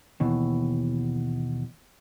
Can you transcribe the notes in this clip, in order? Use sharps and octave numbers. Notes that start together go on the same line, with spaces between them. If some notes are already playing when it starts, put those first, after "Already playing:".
D#2 B2 E3